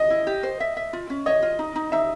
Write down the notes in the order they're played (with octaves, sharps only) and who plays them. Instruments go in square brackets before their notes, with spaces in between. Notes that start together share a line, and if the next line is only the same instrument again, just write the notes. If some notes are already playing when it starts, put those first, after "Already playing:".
Already playing: [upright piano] D#5
[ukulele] E4
G4
C5
E5
E5
F4
C#4
[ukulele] C#5 [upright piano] D#5
[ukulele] F4
D#4
D#4
[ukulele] D#4 [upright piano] E5